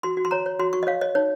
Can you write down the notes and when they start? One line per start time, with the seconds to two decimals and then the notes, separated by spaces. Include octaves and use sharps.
0.03 F#4 C6
0.17 F#4
0.25 C6
0.31 C#5 A#5
0.46 C#5
0.59 F#4 C6
0.73 F#4 C#6
0.83 D#5
0.87 C#5 F5
1.01 C#5 D#5
1.15 D#4 C#5